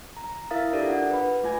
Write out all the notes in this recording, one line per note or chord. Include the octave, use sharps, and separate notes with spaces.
A#5
E4 A#4 E5 F5 D#6 A6
D4 F4 G4 A4 A#4 D5
D4 F#5
B4 B5
A3 F4 G#5 G#6